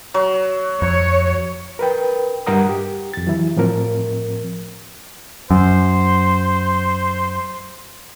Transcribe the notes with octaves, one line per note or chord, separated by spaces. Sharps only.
F#3
F2 C#5
A#4 B4 G5
G2 G3 A#4 F#5 A#5 D#6
G4
F2 A6
E3 F#3 E4
A2 F3 C4 A#4
F#2 C5